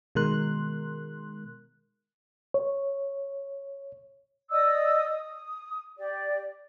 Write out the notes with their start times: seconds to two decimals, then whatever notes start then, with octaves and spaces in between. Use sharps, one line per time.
0.15 B2 D#3 G#3 A#4 C6 F#6
2.54 C#5
4.50 D5 D#5 D#6 E6
5.09 D#6
5.97 G4 D5